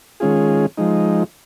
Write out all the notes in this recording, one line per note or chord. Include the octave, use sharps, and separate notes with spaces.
D#3 G#3 C#4 F4 G#4
F3 G#3 D#4